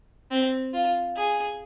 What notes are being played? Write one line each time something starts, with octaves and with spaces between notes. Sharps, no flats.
C4
F4
G#4